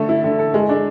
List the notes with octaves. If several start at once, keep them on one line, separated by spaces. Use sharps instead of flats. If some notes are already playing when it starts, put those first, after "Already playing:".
Already playing: D3 A3 A4
E4
D3
A4
G#3
D4